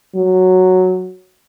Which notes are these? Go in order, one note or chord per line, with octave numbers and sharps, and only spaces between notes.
F#3